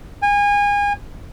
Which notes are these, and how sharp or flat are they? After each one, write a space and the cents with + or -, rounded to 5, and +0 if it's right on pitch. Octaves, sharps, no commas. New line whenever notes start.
G#5 -30